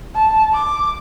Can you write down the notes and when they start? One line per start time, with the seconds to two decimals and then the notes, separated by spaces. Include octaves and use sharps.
0.15 A5
0.53 D6